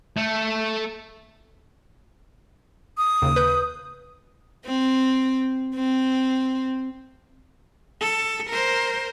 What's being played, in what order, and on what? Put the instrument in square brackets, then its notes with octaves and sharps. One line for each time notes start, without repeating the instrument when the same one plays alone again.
[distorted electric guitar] A3
[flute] D#6
[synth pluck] D#2 C#3
B4 G6
[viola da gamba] C4
C4
[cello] A4
A#4 C5